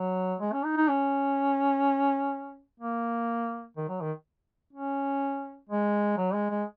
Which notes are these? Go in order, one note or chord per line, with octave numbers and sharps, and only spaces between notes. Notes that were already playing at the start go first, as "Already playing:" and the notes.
Already playing: F#3
G#3
C#4
D#4
D#4
C#4
A#3
D#3
F#3
D#3
C#4
G#3
F#3
G#3
G#3